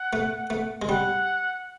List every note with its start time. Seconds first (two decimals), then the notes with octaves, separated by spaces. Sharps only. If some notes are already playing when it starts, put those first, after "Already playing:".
Already playing: F#5
0.13 A3
0.50 A3
0.82 G#3
0.89 G3 F#5